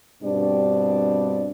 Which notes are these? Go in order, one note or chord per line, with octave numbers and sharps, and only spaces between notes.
G2 B2 G3 C4 D4 D5